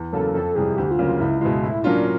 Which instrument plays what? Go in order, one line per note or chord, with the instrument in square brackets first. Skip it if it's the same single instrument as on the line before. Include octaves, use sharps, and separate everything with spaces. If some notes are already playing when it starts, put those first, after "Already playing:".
Already playing: [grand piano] E2
[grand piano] C#3 F#3 A#3 [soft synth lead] A4
[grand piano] F2 [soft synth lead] A4
[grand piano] C3 E3 G3 [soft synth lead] G#4
[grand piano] D2 [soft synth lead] G4
[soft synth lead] F4
[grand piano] C#3 F#3 A#3
[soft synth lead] F4
[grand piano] C#2 [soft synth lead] E4
[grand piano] B2 G#3 [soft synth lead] E4
[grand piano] A2 [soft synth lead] E4
[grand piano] F#3 A#3 C#4 F4 [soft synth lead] D4